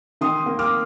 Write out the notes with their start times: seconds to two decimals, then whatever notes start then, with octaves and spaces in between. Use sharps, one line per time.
0.21 D#3 C6 D#6
0.46 A#3
0.59 D6 F6